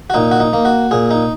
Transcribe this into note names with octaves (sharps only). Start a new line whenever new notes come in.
F#4
A#2 D#4
F#4
D#4
A#3
F#4
A#2 G#4
D#4